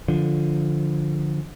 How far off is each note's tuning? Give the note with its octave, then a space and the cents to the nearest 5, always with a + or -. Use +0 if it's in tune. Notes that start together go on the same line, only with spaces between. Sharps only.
D3 +0 F3 +0